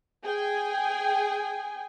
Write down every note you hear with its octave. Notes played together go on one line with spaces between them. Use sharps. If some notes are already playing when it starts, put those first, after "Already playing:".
G#4 G5 G#5